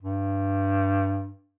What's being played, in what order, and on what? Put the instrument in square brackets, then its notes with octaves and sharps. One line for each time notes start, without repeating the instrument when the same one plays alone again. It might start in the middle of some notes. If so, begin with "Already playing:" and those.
[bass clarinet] G2